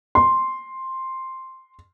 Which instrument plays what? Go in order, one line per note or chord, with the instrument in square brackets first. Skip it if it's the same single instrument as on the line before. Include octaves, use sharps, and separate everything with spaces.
[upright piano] C6